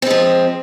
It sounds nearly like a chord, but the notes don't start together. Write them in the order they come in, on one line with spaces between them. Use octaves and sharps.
C4 G#3 F3